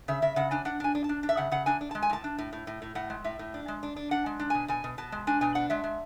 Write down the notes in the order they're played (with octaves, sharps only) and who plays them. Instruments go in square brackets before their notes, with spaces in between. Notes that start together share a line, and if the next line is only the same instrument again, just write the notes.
[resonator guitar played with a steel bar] C#3 E5
C#3 E5
C#3 F#5
D4 G#5
D4 F#5
D4 G#5
D4
A5
D4
D4
E5
C#3 F#5
C#3 F#5
D4 G#5
D4
G#3 A5
G#5
A2 A5
D4
A2
A2
A2
A2
A2 F#5
G#3
A2 E5
A2
D4
G#3
D4
D4
D4 F#5
G#3
D4
B2 G#5
B2 G#5
B2
B2 A5
G#3
D4 G#5
B2 G#5
D4 F#5
G#3 E5
G#3